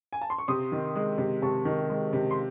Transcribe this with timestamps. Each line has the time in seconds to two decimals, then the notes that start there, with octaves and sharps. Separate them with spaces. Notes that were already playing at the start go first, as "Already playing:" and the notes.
0.13 G#5
0.21 A5
0.30 C6
0.38 C#6
0.48 C3 C6 D#6
0.72 D#3
0.96 G#3
1.18 C3
1.42 C3 A5 C#6
1.65 D#3
1.90 G#3
2.13 C3
2.31 C6